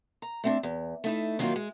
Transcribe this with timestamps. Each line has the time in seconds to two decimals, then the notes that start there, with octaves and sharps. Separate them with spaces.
0.22 A#5
0.44 A3 C4 D4
0.63 E2
1.04 A3 D#4 E4
1.39 D#3 F#3 A#3 C#4 D#4 F4
1.56 G#3